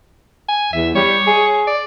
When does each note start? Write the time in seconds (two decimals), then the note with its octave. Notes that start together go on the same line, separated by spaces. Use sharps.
0.48 G#5
0.73 E2 E5
0.95 G3 C#5
1.27 G#4
1.67 D5